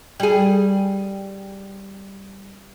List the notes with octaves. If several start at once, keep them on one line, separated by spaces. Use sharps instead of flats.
G3 G#4